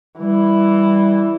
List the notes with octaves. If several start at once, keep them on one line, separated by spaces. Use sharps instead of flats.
E3 G3